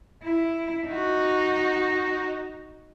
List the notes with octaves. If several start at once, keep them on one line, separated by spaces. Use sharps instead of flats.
E4
D#4 F#4